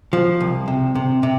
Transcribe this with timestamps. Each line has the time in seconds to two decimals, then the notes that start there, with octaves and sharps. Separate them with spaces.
0.13 F3
0.41 C2
0.68 C3
0.95 C3
1.23 C3